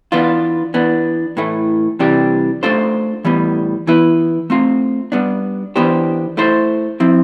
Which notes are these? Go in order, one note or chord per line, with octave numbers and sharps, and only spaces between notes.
E3 B3 D4 F4
E3 B3 D4
A2 E3 A3
C3 E3 G3 D4 G4
A3 D4 F4 A4 C5
A2 E3 G3 B3
E3 B3 E4 B4
A3 C4 F4
G3 B3 D4
E3 B3 D4 G4 C5
A3 E4 A4 C5
F3 C4 E4